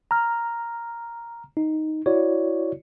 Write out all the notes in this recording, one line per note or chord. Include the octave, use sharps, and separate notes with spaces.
A#5 F6
D#4
E4 F#4 C#5 D5